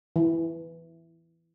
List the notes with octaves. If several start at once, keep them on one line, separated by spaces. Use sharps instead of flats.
E3